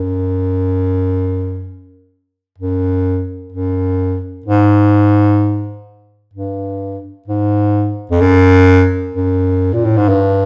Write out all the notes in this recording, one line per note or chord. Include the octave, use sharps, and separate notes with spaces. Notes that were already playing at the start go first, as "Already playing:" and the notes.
Already playing: F#2
F#2
F#2
G#2
G2
G#2
F2
F#2
F#2
A#2
A2
G#2
G2